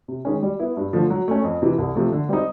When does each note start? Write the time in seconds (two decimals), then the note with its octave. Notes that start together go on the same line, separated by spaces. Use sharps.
0.08 C3
0.25 D#3 G#3 C#4
0.43 G3
0.59 B3 E4
0.77 G2
0.93 D3 F3 A3
1.10 F#3
1.28 A3 C#4
1.44 F2
1.62 C3 E3
1.78 C2
1.95 C3 F3 A3
2.12 D3
2.29 G3 C4 D#4